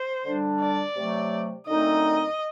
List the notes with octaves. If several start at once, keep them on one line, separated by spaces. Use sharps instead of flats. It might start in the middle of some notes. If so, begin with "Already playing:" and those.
Already playing: C5
D3 G3 D4
D5
C3 F#3 A3
F#2 D3 A3 C4 D#4 D#5